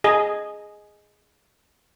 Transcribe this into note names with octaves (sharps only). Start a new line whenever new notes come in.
G#4 D#5